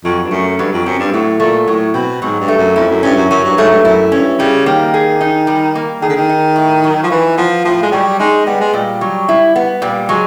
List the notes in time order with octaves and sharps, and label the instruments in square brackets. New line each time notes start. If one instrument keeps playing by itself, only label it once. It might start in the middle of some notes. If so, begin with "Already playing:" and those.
[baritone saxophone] F2 [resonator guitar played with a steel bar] F#3
[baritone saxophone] G2
[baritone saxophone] F#2 [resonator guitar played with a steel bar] A3
[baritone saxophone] G2 [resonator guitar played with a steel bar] F#3
[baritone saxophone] F2
[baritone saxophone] F#2 [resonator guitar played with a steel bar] C4
[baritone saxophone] G2
[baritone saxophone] A2 [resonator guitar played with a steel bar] F#3
[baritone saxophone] A#2 [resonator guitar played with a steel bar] A3
[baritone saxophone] A2 [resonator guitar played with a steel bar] F#3
[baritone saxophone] B2 [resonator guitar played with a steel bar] C4
[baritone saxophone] G#2 [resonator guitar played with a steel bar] F#3
[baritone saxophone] G2
[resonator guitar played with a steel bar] A3
[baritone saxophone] F#2
[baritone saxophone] F2 [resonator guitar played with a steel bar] E4
[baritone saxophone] F#2
[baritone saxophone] G2 [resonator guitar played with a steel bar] C#4
[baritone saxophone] F#2
[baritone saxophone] F#2 [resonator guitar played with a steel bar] F#3
[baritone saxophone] G2
[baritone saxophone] G#2 [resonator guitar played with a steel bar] A3
[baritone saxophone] G2
[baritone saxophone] F#2 [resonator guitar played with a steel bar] E4
[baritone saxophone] G2 [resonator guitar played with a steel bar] C#4
[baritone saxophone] C#3 [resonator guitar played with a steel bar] G3
[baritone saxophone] D#3 [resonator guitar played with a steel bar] A#3
[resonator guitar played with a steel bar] G#4
D#4
G3
A#3
[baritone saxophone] D#3 [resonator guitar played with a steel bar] G#4
[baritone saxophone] D3
D#3
[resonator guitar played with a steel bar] D#4
A2
F#3
[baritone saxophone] F3
[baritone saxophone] E3 [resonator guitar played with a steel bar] D#4
[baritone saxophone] F3 [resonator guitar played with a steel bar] B3
[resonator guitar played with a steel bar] A2 [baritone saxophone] F3
[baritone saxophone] G#3
[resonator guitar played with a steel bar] F#3 [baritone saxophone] G3
[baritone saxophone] G#3 [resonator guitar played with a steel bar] D#4
[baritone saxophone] G3 [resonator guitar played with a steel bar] B3
[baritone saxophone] G#3
[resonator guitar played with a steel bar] A#2 [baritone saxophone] G3
[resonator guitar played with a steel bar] F#3
E4
B3
[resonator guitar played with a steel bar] A#2 [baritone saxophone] G3
[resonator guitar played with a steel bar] F#3 [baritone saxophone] G#3